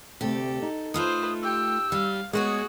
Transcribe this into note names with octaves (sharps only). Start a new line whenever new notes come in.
D2 C3 A3 G4 A4
D#4
A3 F4 A4 B4 C5 D#6
G4 G5 E6
G3 F5
G#3 B3 F#4 G#4 B4 C#5 D#6